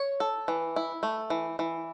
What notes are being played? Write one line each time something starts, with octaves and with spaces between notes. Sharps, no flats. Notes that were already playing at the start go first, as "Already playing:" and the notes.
Already playing: C#5
A4
E3
E4
A3
E3
E3